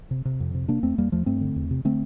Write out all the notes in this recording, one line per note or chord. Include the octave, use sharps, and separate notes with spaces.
C3
C3
F2
C3
C3 A#3 D4
E2 A3 C4
E2 G3 A#3
E2 F3 A3
G2 A3 C4
D3
E2
C3
D3 A3 C4